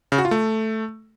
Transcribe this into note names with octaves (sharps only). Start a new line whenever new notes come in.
C#3
F#4
F4
A3